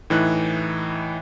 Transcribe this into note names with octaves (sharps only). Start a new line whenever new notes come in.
A2 E3 D#4 F#6